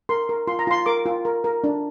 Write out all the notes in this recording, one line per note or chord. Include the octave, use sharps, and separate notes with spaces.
A#4 C6
A#4
F4 C6
A#5
F4 C6
A#4 D6
F4
A#4
A#4
D4